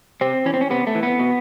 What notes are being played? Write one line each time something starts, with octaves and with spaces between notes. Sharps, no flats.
C3 C4
E3 C#4
C4
C#4
C3 B3
A3
E3
B3
B2